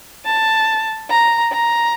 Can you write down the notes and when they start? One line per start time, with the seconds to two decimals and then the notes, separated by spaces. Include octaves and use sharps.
0.25 A5
1.10 A#5
1.52 A#5